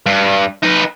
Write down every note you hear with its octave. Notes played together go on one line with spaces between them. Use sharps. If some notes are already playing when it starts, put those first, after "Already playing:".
G2
D#4 B4